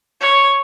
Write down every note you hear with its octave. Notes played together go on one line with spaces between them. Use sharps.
C#5